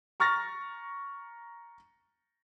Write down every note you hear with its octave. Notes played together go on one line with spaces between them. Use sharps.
A#5 C#6 F6 A6 A#6